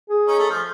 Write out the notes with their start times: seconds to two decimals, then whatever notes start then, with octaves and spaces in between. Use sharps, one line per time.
0.09 G#4
0.27 C#4 D#4
0.39 A3
0.50 F3